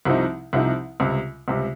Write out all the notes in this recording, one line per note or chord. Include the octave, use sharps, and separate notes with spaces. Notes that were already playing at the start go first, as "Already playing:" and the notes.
C2 C3 F3 C4 D#4
C2 C3 F3 C4 D#4
C#2 C3 G3
C#2 C3 G3